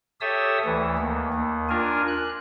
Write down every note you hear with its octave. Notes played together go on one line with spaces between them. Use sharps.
G4 A4 C#5 E5 D#6 E6
D2 E3
D#2
D#2
D4 F4 A#4 G#5
F#6